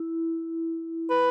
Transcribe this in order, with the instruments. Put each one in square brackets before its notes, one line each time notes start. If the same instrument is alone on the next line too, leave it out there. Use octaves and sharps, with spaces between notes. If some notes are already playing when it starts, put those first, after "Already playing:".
Already playing: [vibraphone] E4
[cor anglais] B4